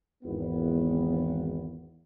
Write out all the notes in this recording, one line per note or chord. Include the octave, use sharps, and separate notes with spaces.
G#1 E2 B3